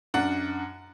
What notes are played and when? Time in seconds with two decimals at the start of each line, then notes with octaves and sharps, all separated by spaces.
0.14 F#2 D4 F#5